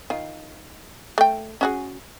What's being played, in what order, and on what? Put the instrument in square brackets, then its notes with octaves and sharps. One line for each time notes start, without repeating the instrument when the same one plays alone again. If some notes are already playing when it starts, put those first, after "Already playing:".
[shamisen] D#3 F4
A3 G5
C#4 F#4 G#4